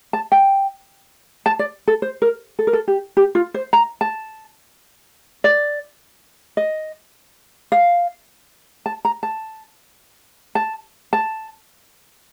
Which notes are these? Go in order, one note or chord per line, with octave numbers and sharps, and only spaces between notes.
A5
G5
A5
D5
A4
C5
A#4
A4
A#4
A4
G4
G4
F4
C5
A#5
A5
D5
D#5
F5
A5
A#5
A5
A5
A5